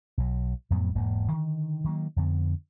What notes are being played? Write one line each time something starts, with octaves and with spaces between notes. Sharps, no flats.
B1 F#3
F2 A2 F#3 B3
E1 G#2 A#3
D3 D#3
D#3 F#3 A3 A#3
F2 D3 B3